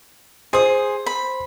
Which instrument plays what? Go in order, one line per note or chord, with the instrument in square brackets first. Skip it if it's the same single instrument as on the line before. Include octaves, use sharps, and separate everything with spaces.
[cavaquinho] G#4 D#6 [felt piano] C5 C6
[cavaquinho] B5